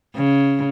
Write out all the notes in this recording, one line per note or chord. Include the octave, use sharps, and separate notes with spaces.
C#3